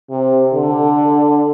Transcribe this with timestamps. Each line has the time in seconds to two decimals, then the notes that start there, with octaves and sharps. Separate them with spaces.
0.10 C3
0.54 D3